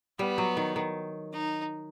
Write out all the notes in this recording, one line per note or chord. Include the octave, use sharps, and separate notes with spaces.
G3 B3
F#3
D#3
D#3
D#4